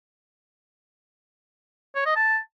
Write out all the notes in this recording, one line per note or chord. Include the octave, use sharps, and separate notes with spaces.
C#5
D#5
A5